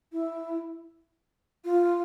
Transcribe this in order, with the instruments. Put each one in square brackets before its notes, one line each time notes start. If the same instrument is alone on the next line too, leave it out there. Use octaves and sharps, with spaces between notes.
[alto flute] E4
F4